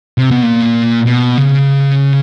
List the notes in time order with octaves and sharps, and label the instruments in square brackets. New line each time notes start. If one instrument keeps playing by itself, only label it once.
[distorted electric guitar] C3
B2
A#2
B2
C#3